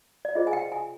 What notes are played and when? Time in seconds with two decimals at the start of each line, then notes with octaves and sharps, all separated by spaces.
0.25 D5
0.35 F4 G#4 C5 D#5
0.47 G#5
0.53 G5
0.72 G#5